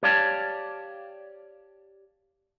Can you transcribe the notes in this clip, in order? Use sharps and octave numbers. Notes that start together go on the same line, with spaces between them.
G4 C#5 D5 F5 G5 A5